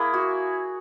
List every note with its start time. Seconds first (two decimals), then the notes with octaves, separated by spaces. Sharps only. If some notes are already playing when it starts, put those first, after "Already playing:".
Already playing: A#3 E4 G#4
0.14 F#4